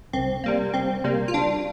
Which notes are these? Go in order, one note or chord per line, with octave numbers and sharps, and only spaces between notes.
C2 C4
C3 G3 A#3
C2 C4
C3 G3 A#3
F4
C2 D4